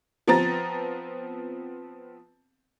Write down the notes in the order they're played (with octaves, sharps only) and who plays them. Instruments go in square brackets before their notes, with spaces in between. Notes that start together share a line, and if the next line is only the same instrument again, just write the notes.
[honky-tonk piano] F3 B3 C4 A#5 A6